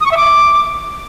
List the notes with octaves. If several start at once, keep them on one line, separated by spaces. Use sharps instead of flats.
D#6
C#6
E5
D6